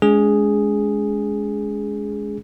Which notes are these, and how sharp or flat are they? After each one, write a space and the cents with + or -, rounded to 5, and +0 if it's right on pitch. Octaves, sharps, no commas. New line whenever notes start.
G#3 +15 D4 -45 G#4 +0